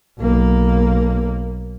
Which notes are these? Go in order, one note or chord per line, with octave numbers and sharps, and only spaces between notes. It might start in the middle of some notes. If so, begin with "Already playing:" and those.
B1 A#3